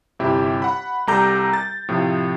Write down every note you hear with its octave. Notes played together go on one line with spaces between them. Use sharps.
G1 C3 E4 G4
F#5 B5
C2 G3 A4 A#5 D6 G6
A6
A2 C3 F3